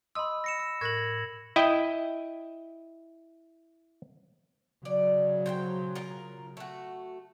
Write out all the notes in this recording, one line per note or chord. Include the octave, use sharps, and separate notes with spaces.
D#5 B5 C6 D#6 E6
A#6 C#7 E7
E6
A2 A#4 F#6 G#6 A#6 F#7
E4 D#5 G5
C#3 F#3 D5
C5 F#5 G5
F4 A#4
A3 F#4